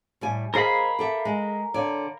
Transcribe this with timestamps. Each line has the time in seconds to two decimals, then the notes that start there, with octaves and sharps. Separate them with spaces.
0.21 A2 G3 G#5
0.54 G#4 A#4 C5 D#5 F5 B5
0.99 G4 A4 E5
1.25 G#3
1.74 D3 C#5 D5